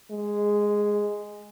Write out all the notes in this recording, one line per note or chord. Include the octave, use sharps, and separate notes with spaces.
G#3